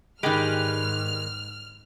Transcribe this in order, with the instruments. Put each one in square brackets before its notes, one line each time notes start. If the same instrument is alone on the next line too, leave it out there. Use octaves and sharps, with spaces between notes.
[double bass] G#2 [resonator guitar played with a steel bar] D#3 G#3 [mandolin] G4 B4 D5 [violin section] F6